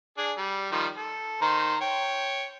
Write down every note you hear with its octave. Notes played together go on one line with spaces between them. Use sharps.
D4 G#4
G3
D#3 F3 G3
A4
D#3 C5 A#5
C#5 G5